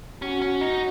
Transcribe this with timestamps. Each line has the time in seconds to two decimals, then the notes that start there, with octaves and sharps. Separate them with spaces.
0.22 C#4 F#4
0.42 C#4
0.61 D#4